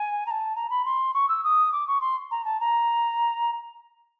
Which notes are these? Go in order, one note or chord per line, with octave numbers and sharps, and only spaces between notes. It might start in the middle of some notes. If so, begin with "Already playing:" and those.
Already playing: G#5
A#5
A5
A#5
B5
C6
C#6
E6
D#6
D6
C#6
C6
A#5
A5
A#5